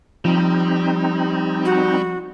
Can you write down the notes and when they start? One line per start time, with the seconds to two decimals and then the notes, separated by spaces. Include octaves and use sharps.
0.25 F3 G3 C4 D#4
1.65 F#4